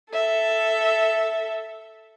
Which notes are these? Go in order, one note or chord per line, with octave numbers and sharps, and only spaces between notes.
A4 E5